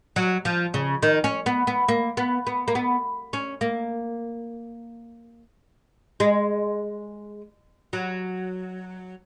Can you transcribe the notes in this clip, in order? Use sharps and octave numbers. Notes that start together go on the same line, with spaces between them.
F#3
F3
C#3
D#3
C#4
B3
B3
A#3
B3
B3
A#3
B3
C#4
A#3
G#3
F#3